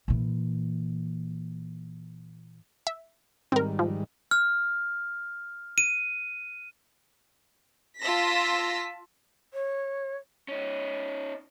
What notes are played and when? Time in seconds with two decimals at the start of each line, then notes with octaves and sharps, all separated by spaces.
0.08 A#2 E3
2.87 E5
3.52 G#2 D#3 G3 C4 A#4
3.79 F3
4.31 F6
5.78 D#7
8.00 F4 A5 E6 A#6 B6
9.53 C#5
10.48 C#4 D#4